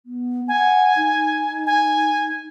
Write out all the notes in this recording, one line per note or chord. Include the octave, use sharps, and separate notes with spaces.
B3
F#5 G#5
D#4
G#5